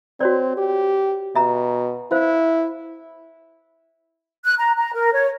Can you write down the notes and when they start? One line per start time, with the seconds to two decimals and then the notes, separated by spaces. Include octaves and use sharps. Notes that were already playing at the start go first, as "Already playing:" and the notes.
0.20 C4 F#4 C#5 D5
0.57 G4
1.35 B2 E5 A#5
2.12 E4 C5 F5
4.44 F#6
4.58 A#5
4.77 A#5
4.93 A#4
5.13 C#5